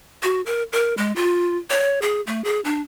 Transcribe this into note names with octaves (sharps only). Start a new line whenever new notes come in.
F#4
A#4
A#4
G#3
F4
C#5
G#4
A3
G#4
D4